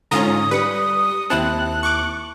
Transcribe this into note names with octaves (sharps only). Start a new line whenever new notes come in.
G#2 D3 C#4 F4 A#5 D#6
G3 B4 C#7
D#2 C4 E4 A5 F#6
C#6 D6